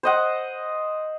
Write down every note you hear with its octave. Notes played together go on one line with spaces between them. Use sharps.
C5 D#5 F#5